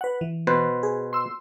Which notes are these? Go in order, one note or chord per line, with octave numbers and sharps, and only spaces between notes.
B4 F#5
E3
B2 B4 C5
G#4
C6 E6